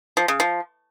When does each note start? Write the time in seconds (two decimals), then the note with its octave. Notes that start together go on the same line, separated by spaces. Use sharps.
0.17 F3
0.28 C#3
0.40 F3